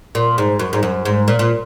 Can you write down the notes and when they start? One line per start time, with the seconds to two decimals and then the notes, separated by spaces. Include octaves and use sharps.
0.15 A#2
0.38 G#2
0.59 F#2
0.73 G#2
0.83 F#2
1.05 G#2
1.28 A#2
1.39 A#2